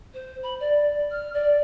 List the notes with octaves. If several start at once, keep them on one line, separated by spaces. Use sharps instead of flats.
C5
B5
D5
F6
D5